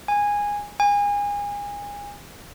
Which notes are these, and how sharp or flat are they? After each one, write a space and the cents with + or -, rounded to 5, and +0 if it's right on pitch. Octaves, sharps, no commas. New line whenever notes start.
G#5 -15
G#5 -30